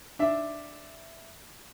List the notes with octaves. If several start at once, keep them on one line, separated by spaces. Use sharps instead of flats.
D4 E5